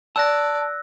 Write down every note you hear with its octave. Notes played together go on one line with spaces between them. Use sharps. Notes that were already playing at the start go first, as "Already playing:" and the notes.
D5 A5 E6 F#6 A#6